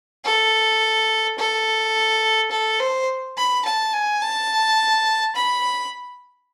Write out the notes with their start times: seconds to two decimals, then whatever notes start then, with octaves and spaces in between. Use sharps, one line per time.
0.25 A4
1.38 A4
2.51 A4
2.80 C5
3.37 B5
3.65 A5
3.93 G#5
4.22 A5
5.36 B5